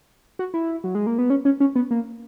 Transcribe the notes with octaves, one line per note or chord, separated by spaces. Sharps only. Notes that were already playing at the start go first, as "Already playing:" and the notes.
F#4
E4
F#3
G#3
A#3
B3
C#4
C#4
C#4
B3
A#3